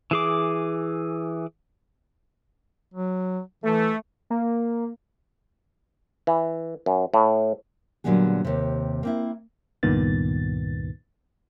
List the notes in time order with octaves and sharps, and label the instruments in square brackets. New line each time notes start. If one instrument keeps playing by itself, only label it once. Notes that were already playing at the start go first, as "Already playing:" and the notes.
[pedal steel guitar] E3 G#4 D6
[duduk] F#3
[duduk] E3 [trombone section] A3
[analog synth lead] A#3
[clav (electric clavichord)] E3
F#2
A2
[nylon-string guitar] A#2 D3 F#3 G3 B3 G#4
D#2 C3
A#3 C4 E4
[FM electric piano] C#2 G2 A#2 D#3 B3 A6